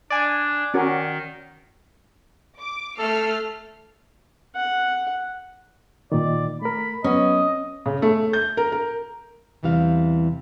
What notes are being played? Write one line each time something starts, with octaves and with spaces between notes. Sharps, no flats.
D4 D5 G#5
D#3 C#4 F#4 A#4
D6
A3 A4 F6 C7
F#5
A#2 D#3 D5
A3 A#4 B5
F#3 B3 C#4 D#5
C#3
A3
G6
A#4
A#4
E2 C3 E3 G3 F5